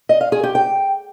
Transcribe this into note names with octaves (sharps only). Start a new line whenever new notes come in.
D#5
F5
G#4
G4
G5